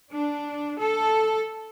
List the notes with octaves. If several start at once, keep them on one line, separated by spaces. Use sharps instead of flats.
D4
A4